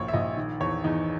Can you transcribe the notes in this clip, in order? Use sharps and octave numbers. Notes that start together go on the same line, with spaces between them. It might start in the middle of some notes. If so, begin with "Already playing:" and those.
Already playing: A#1 A#2 C#5
E5
A#1 D#5
D#3
E2 C#5
E2 D#4